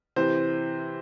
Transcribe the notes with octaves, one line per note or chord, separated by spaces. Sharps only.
C3 E3 C5